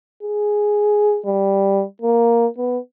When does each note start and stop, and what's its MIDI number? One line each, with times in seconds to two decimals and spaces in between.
0.23 1.19 68
1.26 1.84 55
2.02 2.46 58
2.58 2.78 59